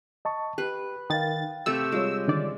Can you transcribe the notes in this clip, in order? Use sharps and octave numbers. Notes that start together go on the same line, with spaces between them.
D#5 A5 C#6
G4 B4
D#3 F5 G5 A6
C3 A3 E6
G3 G#3 F4 C#5
D3 D#3 D5